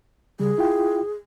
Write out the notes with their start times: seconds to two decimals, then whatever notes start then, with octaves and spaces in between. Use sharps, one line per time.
0.40 C#3 G3 G#4
0.58 E4 F4 G5